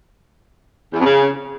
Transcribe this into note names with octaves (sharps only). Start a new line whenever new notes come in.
E2
F2
C#3